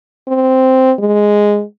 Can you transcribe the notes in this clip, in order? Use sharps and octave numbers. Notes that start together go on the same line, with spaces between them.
C4
G#3